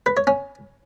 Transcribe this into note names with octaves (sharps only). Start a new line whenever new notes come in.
B4
C#5
C#4